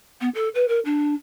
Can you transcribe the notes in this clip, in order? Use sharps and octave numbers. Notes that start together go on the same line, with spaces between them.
B3
A4
B4
A#4
D4